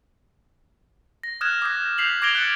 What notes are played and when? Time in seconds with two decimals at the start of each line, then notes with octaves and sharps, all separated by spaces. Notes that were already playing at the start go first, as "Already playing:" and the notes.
1.23 A#6
1.41 D#6 F6 F#6 G#6 E7
1.62 D6 D#6 G6 A#6
1.98 G6 B6 C7 F7 F#7
2.22 D6 G#6 A#6 D7 F7 G7
2.35 F#6 G6 A6 C#7